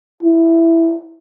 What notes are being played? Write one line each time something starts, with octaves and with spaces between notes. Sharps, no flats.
E4